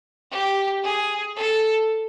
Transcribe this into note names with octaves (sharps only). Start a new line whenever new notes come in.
G4
G#4
A4